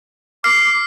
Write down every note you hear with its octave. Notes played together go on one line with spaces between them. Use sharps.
D6 F6 C7